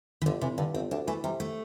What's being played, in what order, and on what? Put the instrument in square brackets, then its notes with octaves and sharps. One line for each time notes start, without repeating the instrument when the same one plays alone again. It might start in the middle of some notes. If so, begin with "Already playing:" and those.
[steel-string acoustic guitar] E3
[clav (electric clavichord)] G1 [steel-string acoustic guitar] D3
[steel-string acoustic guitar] C3 [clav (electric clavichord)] E3
[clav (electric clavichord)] G2 [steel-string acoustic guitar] D3
[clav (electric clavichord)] G1 [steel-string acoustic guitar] C4
[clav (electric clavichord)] D2 [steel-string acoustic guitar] D4
[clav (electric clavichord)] E3 [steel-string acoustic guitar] A3
[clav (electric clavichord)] C3 [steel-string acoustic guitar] G3
[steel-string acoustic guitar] A3